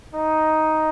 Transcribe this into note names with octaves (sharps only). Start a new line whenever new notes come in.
D#4